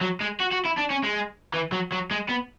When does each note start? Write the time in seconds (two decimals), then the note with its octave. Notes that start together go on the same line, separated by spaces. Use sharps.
0.01 F#3
0.20 G#3
0.40 F#4
0.52 F#4
0.65 E4
0.77 D4
0.90 C#4
1.03 G#3
1.54 E3
1.72 F#3
1.92 F#3
2.11 G#3
2.29 B3